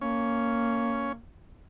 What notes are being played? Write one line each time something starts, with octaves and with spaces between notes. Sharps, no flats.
A#3 C#4